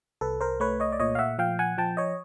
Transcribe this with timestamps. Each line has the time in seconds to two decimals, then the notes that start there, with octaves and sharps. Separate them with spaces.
0.21 C2 A4 B4
0.41 A#4 C5
0.60 A3 B4 C#5
0.80 C#5 D#5
0.92 D5
1.00 A#2 C#5 D#5
1.15 F5
1.19 E5 F#5
1.38 F3 F5 G5
1.59 F#5 G#5
1.78 F3 G5 A5
1.97 C#5 D#5